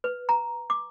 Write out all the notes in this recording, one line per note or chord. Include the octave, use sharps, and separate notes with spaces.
B4
A#5
D6